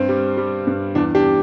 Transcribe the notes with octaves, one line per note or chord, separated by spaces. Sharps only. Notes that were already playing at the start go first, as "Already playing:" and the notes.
Already playing: G2 C4
G3
G3
G2
E2 D4
D4 G4